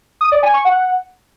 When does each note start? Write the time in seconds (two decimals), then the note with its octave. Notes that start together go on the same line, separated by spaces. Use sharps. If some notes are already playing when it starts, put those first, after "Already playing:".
0.21 D#6
0.32 D5
0.43 G#5
0.54 C#6
0.65 F#5